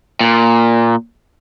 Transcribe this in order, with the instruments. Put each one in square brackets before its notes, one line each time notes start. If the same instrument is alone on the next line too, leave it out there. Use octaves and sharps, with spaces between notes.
[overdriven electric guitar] A#2